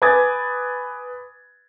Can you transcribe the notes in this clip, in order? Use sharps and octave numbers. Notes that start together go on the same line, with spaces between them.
B4 G#5 D6 D#6 G#6 A6